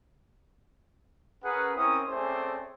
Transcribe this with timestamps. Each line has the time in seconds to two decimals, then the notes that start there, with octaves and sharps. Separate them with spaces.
1.44 C#4 G#4 A#4 B4 F#5
1.75 C4 C#4 E4 A#4 D#6
2.07 A3 C4 C#4 G#4 C5 D5